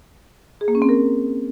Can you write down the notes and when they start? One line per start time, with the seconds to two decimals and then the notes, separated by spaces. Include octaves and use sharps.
0.61 G#4
0.68 A#3
0.75 C#4
0.82 C4
0.89 A#4